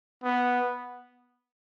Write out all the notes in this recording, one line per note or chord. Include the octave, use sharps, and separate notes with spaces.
B3